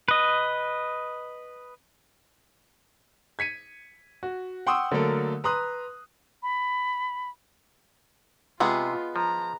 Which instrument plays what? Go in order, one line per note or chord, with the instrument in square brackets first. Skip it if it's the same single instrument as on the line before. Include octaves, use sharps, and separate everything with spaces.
[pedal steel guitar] B4 D#5
[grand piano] G#6 B6 C#7 D#7
F#4
F#5 G5 C6 C#6 D#6 E6
D3 F#3 A3 A#3 A4 A#4
B4 A#5 C6 D#6 F#6
[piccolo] B5
[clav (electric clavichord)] C3 [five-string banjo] G#3 B3 G#4 [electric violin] F4
[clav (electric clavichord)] F3 [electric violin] A#5